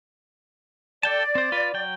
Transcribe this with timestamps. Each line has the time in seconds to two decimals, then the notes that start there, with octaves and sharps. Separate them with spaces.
1.03 A4 D5 G5 A5
1.35 C4 C5
1.52 F4 B4
1.74 F#3 G5